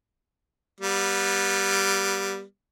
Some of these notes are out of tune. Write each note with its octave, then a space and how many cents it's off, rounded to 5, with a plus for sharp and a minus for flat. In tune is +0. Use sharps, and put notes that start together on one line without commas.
G3 +0 B3 -30